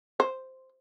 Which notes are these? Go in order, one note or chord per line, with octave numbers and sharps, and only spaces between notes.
C5